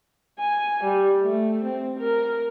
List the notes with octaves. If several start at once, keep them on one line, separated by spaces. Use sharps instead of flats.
G#5
G3
A3
C4
A#4